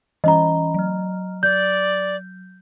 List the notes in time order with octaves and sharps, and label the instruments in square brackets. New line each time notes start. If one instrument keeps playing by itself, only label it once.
[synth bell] E3 C#4 B5 [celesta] D#5 A#5
[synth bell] F#3 F6
[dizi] D5 [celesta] G6